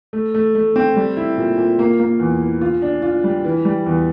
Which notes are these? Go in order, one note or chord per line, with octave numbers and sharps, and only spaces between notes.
A3
A3
A3
C4
G3
E4
A#2
A#2
A#3
A#3
E2
E3
F4
D4
F4
G3
E3
G3
E2